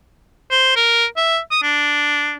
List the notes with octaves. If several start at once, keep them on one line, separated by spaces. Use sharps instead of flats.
C5
A#4
E5
D#6
D4